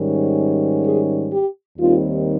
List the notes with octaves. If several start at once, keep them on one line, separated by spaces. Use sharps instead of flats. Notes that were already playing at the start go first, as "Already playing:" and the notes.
Already playing: G#2 D#3 G3 C#4
G#4
G4
D#2 D#3 G3 C4 D#4 F4